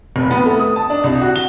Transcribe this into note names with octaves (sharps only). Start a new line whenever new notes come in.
F1
B3
A3
D#6
A5
D4
C2
F#4
G7